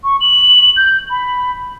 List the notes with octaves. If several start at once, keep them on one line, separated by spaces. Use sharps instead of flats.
C#6
F#7
G6
B5